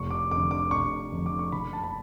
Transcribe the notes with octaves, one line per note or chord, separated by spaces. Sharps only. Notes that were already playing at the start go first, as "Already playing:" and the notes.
Already playing: F1 C#6
D6
F2 D3 D6
D6
F1 C#6
F2 D3
D6
C#6
F#1 B5
A5
B5